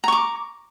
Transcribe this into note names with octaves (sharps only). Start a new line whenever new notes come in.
A#5 C#6 D6